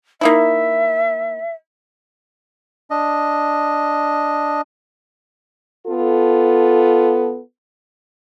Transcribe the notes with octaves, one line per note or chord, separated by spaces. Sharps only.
A#3 D#4 E4 E5
D4 D#5
B3 F4 A4